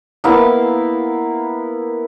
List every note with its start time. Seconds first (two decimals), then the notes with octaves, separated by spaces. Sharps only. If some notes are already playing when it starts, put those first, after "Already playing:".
0.24 A#3 B3 E4 F5